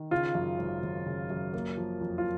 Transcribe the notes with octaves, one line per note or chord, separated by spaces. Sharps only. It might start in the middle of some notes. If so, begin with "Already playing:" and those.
Already playing: D#3
C#3 F4
F#2
G#1
G#1
C#3
F#2
A#3
F3
F2
F4